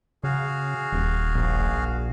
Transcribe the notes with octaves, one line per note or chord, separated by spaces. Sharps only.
C#3 F#4 G#4 F5
D#1
A#1